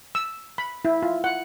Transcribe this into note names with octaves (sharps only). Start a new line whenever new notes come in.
E6
B5
E4
F4
F#5